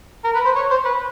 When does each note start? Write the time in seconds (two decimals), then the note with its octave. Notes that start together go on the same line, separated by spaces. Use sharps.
0.24 A#4
0.35 B4
0.45 C5
0.56 C#5
0.71 C5
0.85 B4